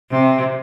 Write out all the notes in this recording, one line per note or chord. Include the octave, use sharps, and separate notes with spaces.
C3